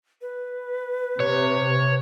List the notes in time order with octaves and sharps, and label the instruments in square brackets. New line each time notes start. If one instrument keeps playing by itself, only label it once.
[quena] B4
[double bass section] C3 [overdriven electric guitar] C#5